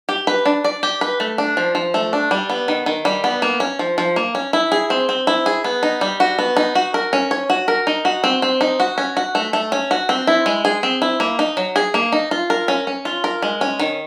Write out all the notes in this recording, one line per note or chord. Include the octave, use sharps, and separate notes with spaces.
G4
B4
D4
D5
G4
B4
A3
D4
F3
F3
A3
D4
G3
B3
D#3
D#3
G3
B3
A#3
C#4
F3
F3
A#3
C#4
E4
G#4
C4
C4
E4
G#4
B3
D#4
G3
F#4
B3
D#4
F#4
A#4
C#4
C#5
F#4
A#4
D#4
F#4
C4
C4
D#4
F#4
C#4
F#4
A3
A3
C#4
F#4
C4
E4
G#3
G#4
C4
E4
A#3
D#4
F#3
G#4
A#3
D#4
F4
A#4
C#4
C#4
F4
A#4
G#3
C#4
D#3